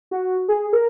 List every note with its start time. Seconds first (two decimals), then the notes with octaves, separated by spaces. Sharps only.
0.11 F#4
0.48 G#4
0.73 A#4